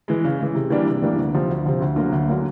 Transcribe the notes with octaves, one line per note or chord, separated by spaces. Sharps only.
E3 G#3
C#3
E3 G#3
C3
E3 G3 A#3 D4
C3
E3 G3 A#3 D4
D2
C3 F3
D2
C3 F3
D2
D3 F#3 A#3
D2
D3 F#3 A#3